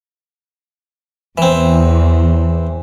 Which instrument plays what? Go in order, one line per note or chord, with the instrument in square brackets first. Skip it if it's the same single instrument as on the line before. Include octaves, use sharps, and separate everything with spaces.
[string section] E2 [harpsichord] E3 C4